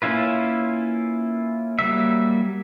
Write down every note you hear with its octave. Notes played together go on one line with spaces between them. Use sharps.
A#3 C#4 E4 F4 B4
F#3 G3 A#3 E5